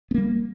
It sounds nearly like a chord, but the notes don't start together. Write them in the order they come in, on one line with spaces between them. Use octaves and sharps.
B3 A#3 G3